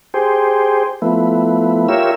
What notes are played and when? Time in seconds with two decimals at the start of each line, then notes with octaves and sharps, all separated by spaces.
0.14 G4 G#4 C5
1.02 F3 A3 B3 E4
1.88 F4 G4 A#4 C#5 E5 E6